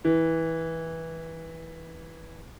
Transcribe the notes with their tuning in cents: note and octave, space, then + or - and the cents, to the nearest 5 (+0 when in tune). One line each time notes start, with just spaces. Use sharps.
E3 -15